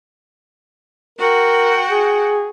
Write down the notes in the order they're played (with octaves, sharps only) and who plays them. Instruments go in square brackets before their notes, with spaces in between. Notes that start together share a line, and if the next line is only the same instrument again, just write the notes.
[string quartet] F#4 F#5 G5 [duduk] A#4
[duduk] G#4